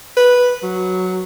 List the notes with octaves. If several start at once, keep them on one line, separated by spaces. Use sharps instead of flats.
B4
F#3